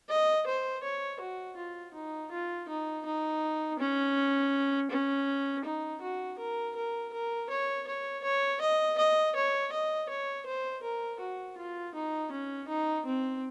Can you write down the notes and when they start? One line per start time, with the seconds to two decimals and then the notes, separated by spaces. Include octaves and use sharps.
0.09 D#5
0.47 C5
0.83 C#5
1.21 F#4
1.57 F4
1.94 D#4
2.32 F4
2.69 D#4
3.06 D#4
3.79 C#4
4.91 C#4
5.65 D#4
6.02 F#4
6.39 A#4
6.76 A#4
7.13 A#4
7.50 C#5
7.87 C#5
8.24 C#5
8.61 D#5
8.98 D#5
9.36 C#5
9.72 D#5
10.09 C#5
10.46 C5
10.83 A#4
11.21 F#4
11.57 F4
11.94 D#4
12.32 C#4
12.68 D#4
13.06 C4